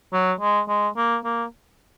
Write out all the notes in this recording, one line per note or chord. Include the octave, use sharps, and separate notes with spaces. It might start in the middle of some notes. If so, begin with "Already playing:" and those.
F#3
G#3
G#3
A#3
A#3